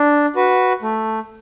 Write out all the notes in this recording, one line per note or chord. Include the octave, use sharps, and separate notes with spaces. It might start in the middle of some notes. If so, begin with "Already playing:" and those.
Already playing: D4
F#4 B4
A3